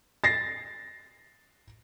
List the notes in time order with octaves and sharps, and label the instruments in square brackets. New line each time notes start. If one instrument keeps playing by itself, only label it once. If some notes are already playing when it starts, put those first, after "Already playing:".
[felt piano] A6 A#6 C7